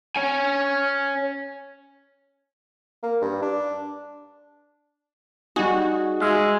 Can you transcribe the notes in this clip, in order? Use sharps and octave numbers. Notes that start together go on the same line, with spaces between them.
C#5 G#5
A#3
G2
D4
G3 D#4 F#4 G#4
G#3 E5 F5